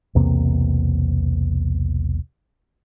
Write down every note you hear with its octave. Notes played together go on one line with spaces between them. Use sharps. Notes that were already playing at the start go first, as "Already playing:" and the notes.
B1 E2 C3 A#3